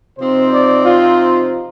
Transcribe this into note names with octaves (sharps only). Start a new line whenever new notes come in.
C3 F3 C4 D#4 C5
D5
F4